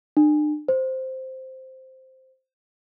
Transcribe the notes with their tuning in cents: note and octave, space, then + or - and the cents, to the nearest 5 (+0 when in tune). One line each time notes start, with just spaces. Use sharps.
D4 +40
C5 +0